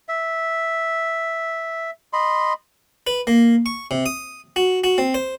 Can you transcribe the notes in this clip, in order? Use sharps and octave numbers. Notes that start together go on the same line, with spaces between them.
E5
D#5 B5 C6
B4
A#3
C#6
C3
D#6
F#4
F#4
C4
C5